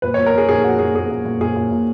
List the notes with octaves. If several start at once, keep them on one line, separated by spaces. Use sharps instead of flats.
A#2 B4
C#5
A#2
A#4
A#2 G#4
A#2 G#4
A#2 F#4
A#2 G#4
A#2 G#4
A#2
A#2
A#2 G#4
A#2
A#2